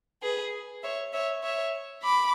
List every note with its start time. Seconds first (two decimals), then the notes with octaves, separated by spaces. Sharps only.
0.22 G#4 B4
0.83 C#5 E5
1.12 C#5 E5
1.43 C#5 E5
2.03 B5 D6